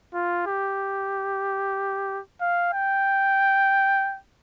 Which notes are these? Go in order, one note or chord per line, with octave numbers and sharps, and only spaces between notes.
F4
G4
F5
G5